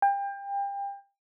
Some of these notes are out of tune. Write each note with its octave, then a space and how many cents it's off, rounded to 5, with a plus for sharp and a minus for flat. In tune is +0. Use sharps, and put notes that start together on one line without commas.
G5 +30